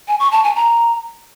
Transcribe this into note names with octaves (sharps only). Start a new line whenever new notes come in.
G#5
C#6
A5
G#5
A#5